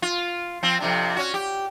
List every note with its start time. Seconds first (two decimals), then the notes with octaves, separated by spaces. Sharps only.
0.02 F4
0.63 F3 C4
0.80 F2 C3 D4
1.16 C#4 F#4
1.34 G4